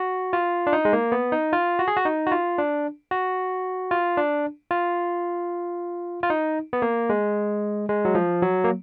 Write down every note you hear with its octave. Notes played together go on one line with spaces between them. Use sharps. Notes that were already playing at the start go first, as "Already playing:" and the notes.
Already playing: F#4
F4
D4
D#4
G#3
A#3
B3
D#4
F4
F#4
G#4
F#4
D#4
F#4
F4
D4
F#4
F4
D4
F4
F4
D#4
B3
A#3
G#3
G#3
F#3
F3
F#3
A#3